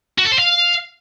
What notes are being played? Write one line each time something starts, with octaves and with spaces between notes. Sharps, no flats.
F#4
A4
C5
F5